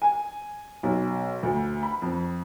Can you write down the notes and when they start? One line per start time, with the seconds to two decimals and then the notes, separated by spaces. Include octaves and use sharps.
0.02 G#5
0.83 B1
1.43 D2
1.83 B5
2.02 F2